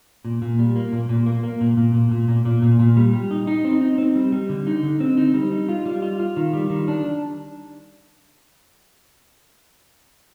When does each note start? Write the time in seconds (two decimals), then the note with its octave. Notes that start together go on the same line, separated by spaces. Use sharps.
0.25 A#2
0.42 A#2
0.59 G3
0.76 A#3
0.92 A#2
1.09 A#2
1.26 A#3
1.43 A#3
1.61 A#2
1.77 A#2
1.94 A#2
2.11 A#2
2.28 A#2
2.45 A#2
2.62 A#2
2.80 A#2
2.97 G3
3.14 G3
3.31 D#4
3.47 D#4
3.65 C4
3.81 D#4
3.98 C4
4.16 G3
4.32 G3
4.49 D3
4.67 D#4
4.83 D3
5.00 C4
5.17 D#4
5.34 G3
5.52 D#4
5.69 F4
5.86 G3
6.02 F4
6.20 F4
6.37 D#3
6.53 G3
6.70 D#3
6.88 D4